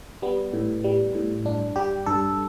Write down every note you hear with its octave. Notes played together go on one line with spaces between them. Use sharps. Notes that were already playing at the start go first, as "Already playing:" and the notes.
G3 B3
A2
G3
A2
G2 D4
G3 G4
G2 A4